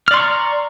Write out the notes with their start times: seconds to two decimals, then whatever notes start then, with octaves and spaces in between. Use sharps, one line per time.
0.08 F6
0.11 D5
0.14 C6
0.17 C#6
0.20 A#5